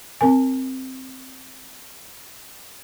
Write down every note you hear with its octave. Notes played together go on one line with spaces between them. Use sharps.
C4 A#4 G#5